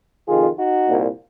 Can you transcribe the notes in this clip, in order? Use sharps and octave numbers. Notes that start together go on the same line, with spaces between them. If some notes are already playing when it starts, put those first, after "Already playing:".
F2 C3 D#3 F4 G#4
D#4 F#4
C2 A#2